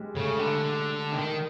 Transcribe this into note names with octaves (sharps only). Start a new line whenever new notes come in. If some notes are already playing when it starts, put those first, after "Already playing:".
Already playing: G3 G#3
C#3 A3
D3
D#3